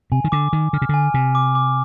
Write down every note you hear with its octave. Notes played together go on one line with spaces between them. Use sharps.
C3 G#5
D#3
D3 D6
D#3 D6
D3 F6
C3
D3 G#5
C3 G#5
D6
D6